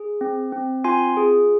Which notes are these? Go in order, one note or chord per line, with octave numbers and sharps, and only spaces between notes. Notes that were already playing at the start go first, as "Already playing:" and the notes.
Already playing: G#4
C4
C4
F4 G#5 C6
G#4